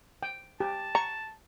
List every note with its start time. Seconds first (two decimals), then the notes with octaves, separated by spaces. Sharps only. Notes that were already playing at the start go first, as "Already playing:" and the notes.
0.23 G5
0.60 G4 A5
0.95 A#5 C#6